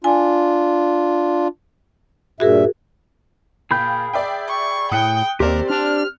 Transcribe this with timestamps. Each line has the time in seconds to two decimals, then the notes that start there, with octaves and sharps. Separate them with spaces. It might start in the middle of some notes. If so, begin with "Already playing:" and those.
0.04 D4 F4 G#5
2.40 G2 A#2 F#4 G#4 A#4 E5
3.71 A#2 G#4 F5 G5 B5 G6
4.13 D5 E5 G5
4.48 C#6
4.92 A2 G5 D#6 F#6 C#7
5.40 D#2 C4 G4 A#4 C5 D5 C6
5.70 D4 F6